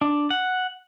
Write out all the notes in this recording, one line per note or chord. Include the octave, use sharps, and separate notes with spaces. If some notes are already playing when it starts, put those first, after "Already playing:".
D4
F#5